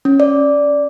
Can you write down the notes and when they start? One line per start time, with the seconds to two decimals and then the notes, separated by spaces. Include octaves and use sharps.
0.05 C#4
0.20 D5